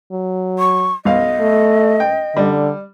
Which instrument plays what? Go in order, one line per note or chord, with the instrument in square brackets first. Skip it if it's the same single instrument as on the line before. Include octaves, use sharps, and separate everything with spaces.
[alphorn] F#3
[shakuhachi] C#6
[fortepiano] B1 F5 [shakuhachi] D#5
[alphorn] A3
[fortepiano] G5
[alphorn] D3 [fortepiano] G3